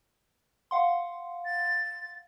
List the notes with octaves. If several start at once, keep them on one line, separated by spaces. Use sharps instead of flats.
F5 F#5 C6
A6